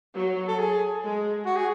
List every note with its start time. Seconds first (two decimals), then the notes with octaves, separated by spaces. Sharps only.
0.15 F#3
0.48 A4
0.59 G#4
1.02 G#3
1.45 F#4
1.57 G#4